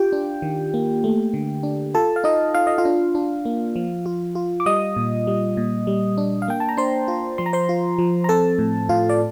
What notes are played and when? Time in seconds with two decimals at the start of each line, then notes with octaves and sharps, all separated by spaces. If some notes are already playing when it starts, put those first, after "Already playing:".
Already playing: F4 G4 G5
0.12 D4
0.42 D#3
0.74 A#3
1.04 A3
1.34 D3
1.63 D4
1.94 F4 A4 A5
2.16 F5
2.24 D#4 F4 D#5
2.54 F4 F5
2.67 D#5
2.78 F4 F5
2.85 D4
3.15 D4
3.45 A#3
3.76 F3
4.06 F4
4.35 F4
4.60 D6
4.66 G3 D#5 D#6
4.96 A#2
5.27 G3
5.57 A#2
5.87 G3
6.18 D4
6.42 F5
6.48 A#3 G5
6.60 A5
6.69 A#5
6.77 D4 C5 C6
7.08 F4
7.38 F3 C6
7.46 A#5
7.53 C5 C6
7.69 F4
7.98 F3
8.24 A#5
8.29 C4 A4 A5
8.59 A2
8.89 A2 F4 F5
9.09 D5